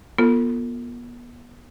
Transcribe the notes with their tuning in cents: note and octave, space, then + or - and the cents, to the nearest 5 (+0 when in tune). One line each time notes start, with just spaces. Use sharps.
B3 -35 F4 +0 A4 +35